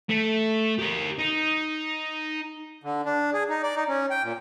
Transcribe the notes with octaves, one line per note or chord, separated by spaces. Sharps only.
A3 A4
G4 A#4
D#4
D3
D4
G#4
D#4
D5
D#4
C#4
G5
A#2